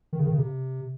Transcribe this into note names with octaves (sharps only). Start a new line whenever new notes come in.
D#3
C#3
D#3
C#3
C3